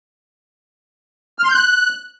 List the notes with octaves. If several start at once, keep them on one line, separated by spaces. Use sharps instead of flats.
F6
C6
G6
F#6